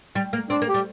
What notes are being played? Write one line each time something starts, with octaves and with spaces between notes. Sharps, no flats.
G3
A#3
C4 D4
A#3
G4
G3